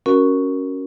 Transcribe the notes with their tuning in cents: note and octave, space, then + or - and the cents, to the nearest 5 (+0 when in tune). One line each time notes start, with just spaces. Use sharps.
C#4 +0 F#4 +0 A#4 +0